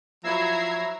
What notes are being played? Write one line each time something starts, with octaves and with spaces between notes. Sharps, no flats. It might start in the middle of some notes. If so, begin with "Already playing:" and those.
F3 F#3 E4 E5 A#5 E6 G#6 C7